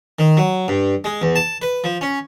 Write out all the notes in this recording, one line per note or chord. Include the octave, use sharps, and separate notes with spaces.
D#3
F#3
G2
G#3
E2
A5
B4
F3
C#4